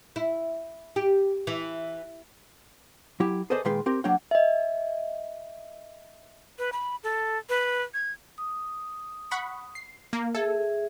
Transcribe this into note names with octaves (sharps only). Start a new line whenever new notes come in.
E4
G4
E3
F#3 E4 G4
G#4 A4 B4 C5 D5 D#5
A#2 D#3 G#3 B4 G5 C6
C4 G4 A#4
F#3 A#3 D4 C#5 F#5 G5
D#5 E5
B4
B5
A4
B4
G#6
D#6
F#5 B5 C#6
C7
A#3
G#4 A4 E5